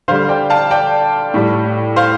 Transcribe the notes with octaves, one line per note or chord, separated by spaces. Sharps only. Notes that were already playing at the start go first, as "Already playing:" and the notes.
D3 G3 C5 F5
D5 G5
F5 A5
D5 G5
A2 G3
C5 F5